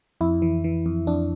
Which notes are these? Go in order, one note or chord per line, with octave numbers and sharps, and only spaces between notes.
F2 E4
E3
E3
F2
F2 D4